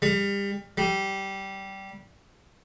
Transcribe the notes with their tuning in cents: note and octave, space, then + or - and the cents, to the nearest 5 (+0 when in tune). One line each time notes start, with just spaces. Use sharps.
G3 +30
G3 -15